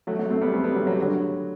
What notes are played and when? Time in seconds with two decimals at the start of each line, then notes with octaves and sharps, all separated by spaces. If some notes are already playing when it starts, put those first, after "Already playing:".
0.07 F#3 A3
0.19 F#3 A3
0.30 A3 C4
0.41 G3 B3
0.53 A3 C4
0.64 G3 B3
0.75 F#3 A3
0.87 F#3
0.95 G3
1.02 D3 F#3